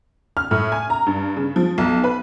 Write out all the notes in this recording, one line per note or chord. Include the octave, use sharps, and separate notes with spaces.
F6
A2
G#5
A#5
G2
C#3
F3
B1
B4